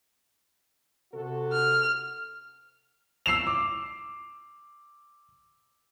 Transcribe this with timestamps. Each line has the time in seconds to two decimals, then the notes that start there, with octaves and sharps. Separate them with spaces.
1.14 C3 F#4 A4
1.53 F6
3.26 E6 C7 E7 F7
3.47 D6